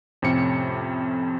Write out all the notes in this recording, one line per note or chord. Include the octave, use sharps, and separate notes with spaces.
F2 A2 C3 C#4 G4 C#7